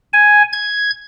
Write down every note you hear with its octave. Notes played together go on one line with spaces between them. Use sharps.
G#5
G#6